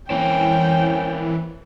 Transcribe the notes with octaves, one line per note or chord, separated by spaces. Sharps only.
E3 A#3 C4 C#4 G5